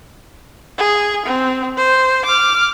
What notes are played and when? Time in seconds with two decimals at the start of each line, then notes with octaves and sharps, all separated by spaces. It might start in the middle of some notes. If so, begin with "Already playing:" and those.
0.78 G#4
1.26 C4
1.77 C5
2.26 D6 F6